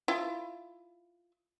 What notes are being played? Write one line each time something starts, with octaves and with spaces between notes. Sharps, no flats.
E4 F4